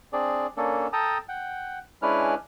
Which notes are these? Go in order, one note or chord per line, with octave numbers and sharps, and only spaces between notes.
C4 D4 G#4 D5
A#3 C#4 D4 A4
A4 G5 A5 A#5 D#6
F#5 G5
G#3 C#4 D4 E4 B4 F6